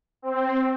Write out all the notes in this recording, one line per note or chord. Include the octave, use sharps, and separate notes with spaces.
C4